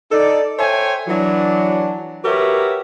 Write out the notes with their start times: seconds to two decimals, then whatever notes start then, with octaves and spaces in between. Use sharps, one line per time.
0.11 D#4 A4 D5
0.58 A4 C5 C#5 E5 G5 G#5
1.07 E3 F#3 D4
2.24 F#4 G4 A#4 B4 C#5 E5